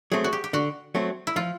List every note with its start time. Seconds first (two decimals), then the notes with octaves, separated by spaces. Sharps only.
0.12 F#3 A3 C4 G#4
0.24 F#4
0.33 G4
0.44 G4
0.53 D3 F#4
0.95 F#3 A3 C4
1.27 E4
1.36 F3 F4